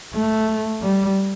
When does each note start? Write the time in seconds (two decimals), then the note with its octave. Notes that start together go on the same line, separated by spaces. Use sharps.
0.14 A3
0.82 G3